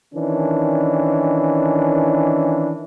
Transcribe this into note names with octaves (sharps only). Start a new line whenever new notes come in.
D#3 E3 C#4 D4